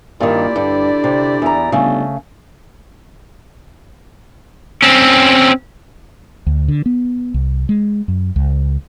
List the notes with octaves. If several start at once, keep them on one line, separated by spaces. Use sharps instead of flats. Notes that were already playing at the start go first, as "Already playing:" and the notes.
G2 A#2 D#3 E4 G4 D5
G2 D3
C3
E2 A#5
G1 C#3 A3
C4 C#4
D2
D3
B3
C2
G#3
F#2
C#2